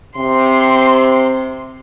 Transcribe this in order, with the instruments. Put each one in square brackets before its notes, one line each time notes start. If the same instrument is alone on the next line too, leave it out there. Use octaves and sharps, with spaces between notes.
[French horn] C3 [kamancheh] C6